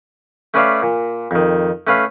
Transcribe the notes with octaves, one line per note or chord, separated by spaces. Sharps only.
A3 C#4 B4 D5 E5 F5
A#2
F2 D#3
A3 C#4 B4 F5